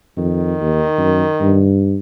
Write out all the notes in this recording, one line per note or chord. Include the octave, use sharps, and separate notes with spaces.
F2 D#3
D#2
F#2
G2